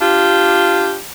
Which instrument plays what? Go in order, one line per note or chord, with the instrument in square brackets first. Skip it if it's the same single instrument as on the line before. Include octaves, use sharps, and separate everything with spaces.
[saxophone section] D4 F4 G4